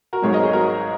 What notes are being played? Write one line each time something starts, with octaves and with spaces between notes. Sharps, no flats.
F#4 A#4
G#1 G#2 F#3 G#4 C#5
A#4 D#5
G#4 C#5
F#4 A#4